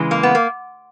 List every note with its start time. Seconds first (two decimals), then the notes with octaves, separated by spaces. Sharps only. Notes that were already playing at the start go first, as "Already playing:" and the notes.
Already playing: C#3 E3 G#3
0.11 A#3
0.23 B3
0.35 A#3